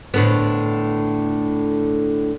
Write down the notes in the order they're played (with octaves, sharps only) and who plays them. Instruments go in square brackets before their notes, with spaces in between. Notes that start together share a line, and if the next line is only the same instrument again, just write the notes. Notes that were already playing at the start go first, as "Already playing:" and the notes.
[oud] A2 D3 B3